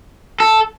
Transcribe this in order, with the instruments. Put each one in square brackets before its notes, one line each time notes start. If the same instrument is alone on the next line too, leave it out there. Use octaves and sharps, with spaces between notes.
[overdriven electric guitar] A4